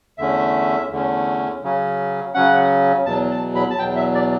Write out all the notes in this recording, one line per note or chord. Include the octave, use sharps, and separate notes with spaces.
E2 D3 A3 C#4 E5
E2 D3 A3 C#4
C#3 F#3 C#4
C#3 F#3 C#4 F#5
E2 B2 F#3 A5
A5
B5
A5
E2 B2 F#3 G5
E5
D5